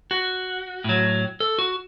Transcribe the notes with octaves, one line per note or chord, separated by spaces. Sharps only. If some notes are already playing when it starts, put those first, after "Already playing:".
F#4
A2 F#3
A4
F#4